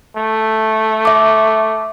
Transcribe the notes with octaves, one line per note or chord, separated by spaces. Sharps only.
A3
E5 D6